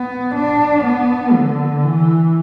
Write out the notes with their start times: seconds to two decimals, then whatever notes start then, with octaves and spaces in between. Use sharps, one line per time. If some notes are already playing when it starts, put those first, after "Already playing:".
Already playing: B3
0.35 D4
0.85 B3
1.35 D3
1.84 E3